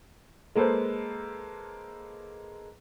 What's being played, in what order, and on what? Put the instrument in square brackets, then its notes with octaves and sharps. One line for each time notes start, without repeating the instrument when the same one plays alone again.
[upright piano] G#3 A#3 A4 B4 C5